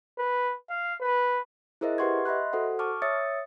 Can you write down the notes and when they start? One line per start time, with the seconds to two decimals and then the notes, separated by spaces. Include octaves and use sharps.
0.19 B4
0.70 F5
1.01 B4
1.81 E4 G#4 A#4 C5 D#5 E5
1.98 G4 B4 F#5 C6 C#6 G#6
2.25 D#5 E5 B5 C6 F#6
2.53 F#4 A4 C5 F#5
2.79 A5 C#6 D6 F6
3.02 C#5 E5 D#6 E6 A6 C#7